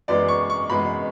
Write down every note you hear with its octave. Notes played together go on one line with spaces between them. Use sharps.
F#2 E3 G#3 B3 D5
C#6
C#6
F#2 E3 G#3 B3 B5